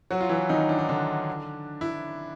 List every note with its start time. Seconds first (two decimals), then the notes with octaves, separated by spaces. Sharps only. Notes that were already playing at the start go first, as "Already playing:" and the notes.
0.11 F#3 F#4
0.21 F4
0.29 E3 E4
0.49 D#3 D#4
0.69 D4
0.79 D#4
0.89 D3 D4
1.81 E4